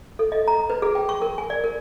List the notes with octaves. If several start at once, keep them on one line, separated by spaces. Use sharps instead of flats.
A4
D#5
A#5
B4
G#4
G5
C#6
A#4
G#5
D5
A#4